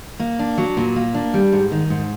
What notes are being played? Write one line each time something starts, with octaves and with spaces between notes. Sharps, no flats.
A#3
D4
F#3
A#2
A#3
D4
G3
G#2
D#3
G#2